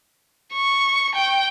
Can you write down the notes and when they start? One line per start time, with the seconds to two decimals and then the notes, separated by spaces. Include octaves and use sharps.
0.54 C#6
1.15 G5